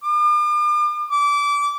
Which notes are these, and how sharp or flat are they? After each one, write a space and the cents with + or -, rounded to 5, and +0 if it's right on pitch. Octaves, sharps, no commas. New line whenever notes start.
D6 +45
D6 -25